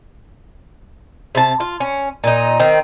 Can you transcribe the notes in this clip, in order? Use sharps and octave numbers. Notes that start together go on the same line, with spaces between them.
C3 A5
F4
C#4
A#2 D#4
D#3 C4